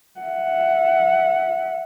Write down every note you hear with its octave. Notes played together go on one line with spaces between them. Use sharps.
E5 F#5